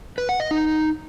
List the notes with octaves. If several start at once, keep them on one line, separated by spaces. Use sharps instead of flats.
B4
F#5
D#5
D#4